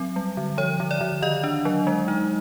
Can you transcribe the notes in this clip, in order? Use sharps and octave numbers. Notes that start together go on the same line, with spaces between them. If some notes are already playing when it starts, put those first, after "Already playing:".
Already playing: F#3 C4
G3
D3
F3 C#5
D3
D5
D3
D#3 D#5
D4
F#3
G#3
D#4